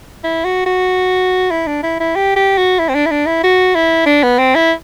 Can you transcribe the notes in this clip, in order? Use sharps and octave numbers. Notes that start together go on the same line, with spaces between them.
E4
F#4
F#4
E4
D4
E4
E4
G4
G4
F#4
E4
C4
D4
E4
D4
E4
F#4
E4
D4
B3
C4
E4